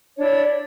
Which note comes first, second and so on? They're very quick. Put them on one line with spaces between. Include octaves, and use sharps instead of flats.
C#5 D4 E4 D5